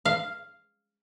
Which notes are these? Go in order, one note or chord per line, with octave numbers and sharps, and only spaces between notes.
F5